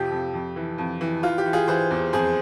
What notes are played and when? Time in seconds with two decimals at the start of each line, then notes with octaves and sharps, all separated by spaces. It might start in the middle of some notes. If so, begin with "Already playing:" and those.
Already playing: F2 C3 F3 G4
0.11 F2
0.34 F2
0.56 E3
0.78 F2
1.01 E3
1.23 E3 F4
1.38 G4
1.46 E3
1.53 F4 G#4
1.68 E3 G#4 C5
1.91 E2
2.13 F2 G#4 C5